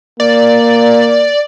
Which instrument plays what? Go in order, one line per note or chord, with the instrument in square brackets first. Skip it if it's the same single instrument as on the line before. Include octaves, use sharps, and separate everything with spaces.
[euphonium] A#3 [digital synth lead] D5